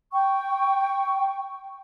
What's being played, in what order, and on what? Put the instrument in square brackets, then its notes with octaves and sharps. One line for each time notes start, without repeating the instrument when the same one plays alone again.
[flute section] G5 C#6